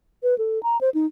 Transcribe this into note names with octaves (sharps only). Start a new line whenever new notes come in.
B4
A4
A#5
C5
D#4